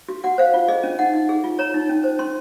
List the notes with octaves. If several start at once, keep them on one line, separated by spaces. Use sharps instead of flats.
F#4
F#4 F#5
C5 F5
F4
G#4 D#5
C#4
D#4 F#5
D#4
G#4
F4
C#5 A#5
D#4
C#4
C5
C#4 C6